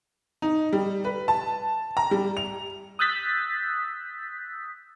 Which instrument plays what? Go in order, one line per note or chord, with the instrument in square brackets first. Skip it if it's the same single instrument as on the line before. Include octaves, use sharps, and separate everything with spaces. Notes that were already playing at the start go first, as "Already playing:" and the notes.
[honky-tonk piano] D#4
G3
B4
A5
A#5
G3
F7
[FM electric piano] D#6 E6 F#6 G6 A6 B6